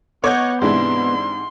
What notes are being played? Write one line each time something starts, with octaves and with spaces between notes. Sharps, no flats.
B3 C#5 D#5 F#5 D6 G6
G#2 C3 E3 G#3 D4 E4 C6